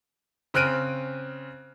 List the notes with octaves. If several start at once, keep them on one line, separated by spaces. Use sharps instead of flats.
C#3 C4 F6 F#6 D7 D#7